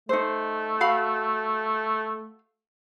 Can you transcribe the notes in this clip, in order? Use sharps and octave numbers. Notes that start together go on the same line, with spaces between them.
A3 D#4 C5
F#4 F5 B5